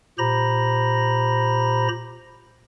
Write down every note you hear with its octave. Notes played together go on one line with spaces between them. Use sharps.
A#2 G4 C5 A#5 B5 A#6